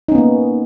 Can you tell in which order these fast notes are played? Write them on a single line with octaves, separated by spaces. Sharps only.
D#4 C#4 B3 A#3